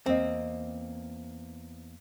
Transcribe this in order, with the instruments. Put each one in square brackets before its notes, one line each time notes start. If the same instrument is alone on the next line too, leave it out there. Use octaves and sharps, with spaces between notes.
[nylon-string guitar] E2 A#3 D#5 [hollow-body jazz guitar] C4